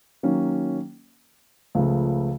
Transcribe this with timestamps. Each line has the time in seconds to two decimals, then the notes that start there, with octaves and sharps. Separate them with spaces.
0.23 D#3 F#3 A#3 C#4
1.75 C#2 C#3 F3 A3